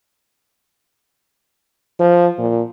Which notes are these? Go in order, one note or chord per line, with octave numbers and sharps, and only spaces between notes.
F3
A#2